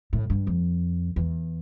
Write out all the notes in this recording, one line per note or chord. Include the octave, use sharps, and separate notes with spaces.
A2
G2
F2
E2